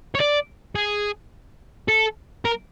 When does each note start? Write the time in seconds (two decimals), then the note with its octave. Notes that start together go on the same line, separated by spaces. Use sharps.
0.15 C#5
0.20 D5
0.76 G#4
1.88 A4
2.45 A#4